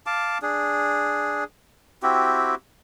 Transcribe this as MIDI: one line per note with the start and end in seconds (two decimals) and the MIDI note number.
0.06 0.38 77
0.06 0.38 81
0.06 0.38 86
0.42 1.44 62
0.42 1.44 68
2.03 2.55 60
2.03 2.55 64
2.03 2.55 66
2.03 2.55 67